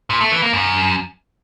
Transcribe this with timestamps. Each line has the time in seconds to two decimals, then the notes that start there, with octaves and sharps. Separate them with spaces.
0.10 A#2
0.21 A3
0.31 E3
0.42 A#3
0.53 F#2